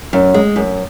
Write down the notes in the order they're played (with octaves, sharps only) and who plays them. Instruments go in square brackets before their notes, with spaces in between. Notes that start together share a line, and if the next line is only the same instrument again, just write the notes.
[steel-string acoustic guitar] F#2
G#3
F#2